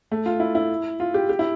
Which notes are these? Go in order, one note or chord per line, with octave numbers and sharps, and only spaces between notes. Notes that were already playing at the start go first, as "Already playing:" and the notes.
A3
F4
E4
E4
F4
G4
G4
E4